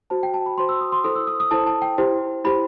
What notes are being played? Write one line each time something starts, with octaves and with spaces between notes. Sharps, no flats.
F#4 C5 A5
G5
A5
B5
F#4 C5 C6
E6
D#6
C6
E4 A4 C5 D#6
E6
D#6
D#6
E4 A4 C5 A5
A5
G5
E4 G4 C5
E4 G4 C5 B5